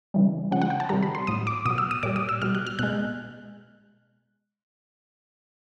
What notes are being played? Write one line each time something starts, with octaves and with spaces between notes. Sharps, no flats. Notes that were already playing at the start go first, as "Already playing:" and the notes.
C#3 E3 G3
C#3 F3 G#3 F#5
F#5
G5
A5
C3 D#3 G3 A#5
B5
C6
A2 F#3 D#6
D6
B2 F#3 D#6
E6
D#6
A#2 G3 D6
D#6
E6
B2 G3 F6
F#6
F6
B2 G#3 F#6